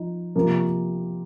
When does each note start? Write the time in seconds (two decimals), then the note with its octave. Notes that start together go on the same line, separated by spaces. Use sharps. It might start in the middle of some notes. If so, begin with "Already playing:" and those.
Already playing: F3 D#4
0.36 C3 F3 A#3